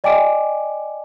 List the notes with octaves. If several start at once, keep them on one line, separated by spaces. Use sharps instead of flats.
D5 D#5 G5 G#5 D6 D7